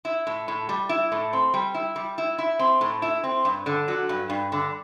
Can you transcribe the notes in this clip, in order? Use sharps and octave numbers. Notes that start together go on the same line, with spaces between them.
E4
A2
A2
G3
E4
A2
C4
G3
E4
G3
E4
E4
C4
A2
E4
C4
G2
D3
F#3
G2
G2
D3